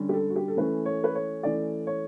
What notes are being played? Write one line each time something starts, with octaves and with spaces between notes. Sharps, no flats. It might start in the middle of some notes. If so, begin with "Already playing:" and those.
Already playing: D3 G3 C#4
G4
A4
F#4
G4
A4
E3 A3 C#4 B4
C#5
B4
C#5
E3 A3 C#4 D5
C#5